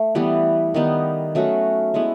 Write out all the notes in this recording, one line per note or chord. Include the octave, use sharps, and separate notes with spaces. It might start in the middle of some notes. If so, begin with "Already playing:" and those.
Already playing: A3
E3 G3 B3
D#3 G3 B3 D#4
F#3 A3 C#4 F#4
G#3 B3 E4